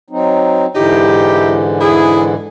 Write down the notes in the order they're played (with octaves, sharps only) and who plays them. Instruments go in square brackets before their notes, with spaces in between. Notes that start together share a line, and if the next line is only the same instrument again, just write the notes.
[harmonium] F#3 C4 D#4
[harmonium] G#2 D3 E3 [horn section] D#4 E4 G4
[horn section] E4 G#4